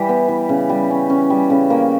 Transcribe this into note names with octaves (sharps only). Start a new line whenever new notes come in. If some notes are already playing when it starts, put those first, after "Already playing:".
Already playing: E3 G3 G4
B3
E3
C#3
G3
C#4
C#4
G3
C#3
A#3